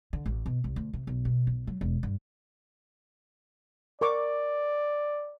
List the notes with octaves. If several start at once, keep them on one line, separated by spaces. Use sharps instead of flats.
D3
A1
B2
C2
D2
C3
B1
B2
B1
F#3
E1
G2
A#4 D5 C#6 D6